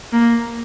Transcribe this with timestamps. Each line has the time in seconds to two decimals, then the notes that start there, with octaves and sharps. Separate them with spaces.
0.13 A#3